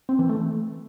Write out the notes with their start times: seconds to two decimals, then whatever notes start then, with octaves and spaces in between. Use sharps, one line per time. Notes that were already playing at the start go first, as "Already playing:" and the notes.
0.09 C4
0.19 E3
0.29 A3